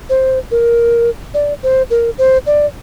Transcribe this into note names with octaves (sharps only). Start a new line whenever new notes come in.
C5
A#4
D5
C5
A#4
C5
D5